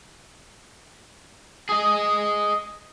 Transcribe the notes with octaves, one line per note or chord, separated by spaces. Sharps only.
G#4 D#5